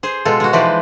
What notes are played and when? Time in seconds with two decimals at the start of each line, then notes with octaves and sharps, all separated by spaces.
0.03 G#4 C5
0.25 B2 G#3 F4 A4
0.40 G#3 F#4
0.53 E3 F3 D#4 B4 C5 D5